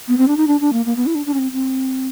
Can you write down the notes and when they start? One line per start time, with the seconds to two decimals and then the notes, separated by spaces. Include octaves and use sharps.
0.08 B3
0.18 C4
0.28 D4
0.37 D#4
0.47 D4
0.60 D4
0.73 A#3
0.85 A#3
0.96 B3
1.06 E4
1.15 D4
1.26 D4
1.34 C#4
1.39 C4
1.52 C4